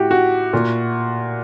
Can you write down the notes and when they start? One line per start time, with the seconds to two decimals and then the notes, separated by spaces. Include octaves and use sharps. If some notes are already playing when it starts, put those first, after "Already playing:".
Already playing: A2 F#4 G4
0.11 F#4
0.53 A#2